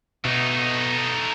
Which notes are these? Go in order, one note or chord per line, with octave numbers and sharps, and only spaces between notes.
B2 A3 D#4